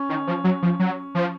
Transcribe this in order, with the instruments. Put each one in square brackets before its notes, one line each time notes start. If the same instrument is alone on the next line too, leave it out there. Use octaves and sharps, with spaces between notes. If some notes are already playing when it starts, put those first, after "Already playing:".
Already playing: [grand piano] C#4
[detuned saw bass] D#3
F3
F#3
F3
F#3
F3